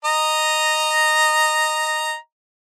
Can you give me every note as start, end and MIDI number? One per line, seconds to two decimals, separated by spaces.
0.05 2.15 75
0.05 2.15 82